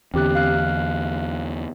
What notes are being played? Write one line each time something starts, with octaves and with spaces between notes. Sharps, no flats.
E2 D3 C4 G4 F#6
F5 F6 F#6